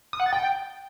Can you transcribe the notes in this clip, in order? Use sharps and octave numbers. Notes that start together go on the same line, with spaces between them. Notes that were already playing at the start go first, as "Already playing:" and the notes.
D#6
F#5
A6
G5